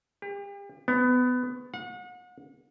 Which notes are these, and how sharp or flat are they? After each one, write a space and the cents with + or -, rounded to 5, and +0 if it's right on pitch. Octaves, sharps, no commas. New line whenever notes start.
G4 +40
B3 +20
F#5 -35